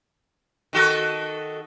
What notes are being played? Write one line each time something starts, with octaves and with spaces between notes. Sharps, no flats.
D#3 F#4 A4